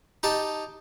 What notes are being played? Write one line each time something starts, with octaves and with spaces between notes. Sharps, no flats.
D#4 G4 A5